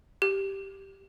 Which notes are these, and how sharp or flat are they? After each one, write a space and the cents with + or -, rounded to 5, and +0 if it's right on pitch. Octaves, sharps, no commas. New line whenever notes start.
G4 -5